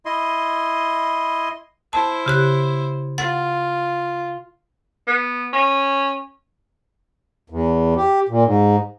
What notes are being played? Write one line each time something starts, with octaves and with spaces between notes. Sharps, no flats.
E4 D#5 C6
E4 C5 A5
C#3 G4 F#6
F4 F#5 A6
B3
C#4
E2
G4
A#2
G#2